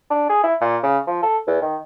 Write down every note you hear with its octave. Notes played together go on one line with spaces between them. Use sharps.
D4
G#4
E4
A#2
C#3
F3
A4
E2
D#3